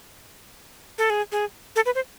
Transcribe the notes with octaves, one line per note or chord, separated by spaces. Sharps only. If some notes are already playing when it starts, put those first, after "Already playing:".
A4
G#4
G#4
A4
B4
C5